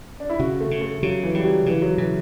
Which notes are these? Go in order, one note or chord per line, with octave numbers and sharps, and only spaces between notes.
D4
E4
C#3 F#4
A3
C#3
A3
C#3 F#3
E3
C#3 G3
F#3
C#3 E3
F#3
C#3 E3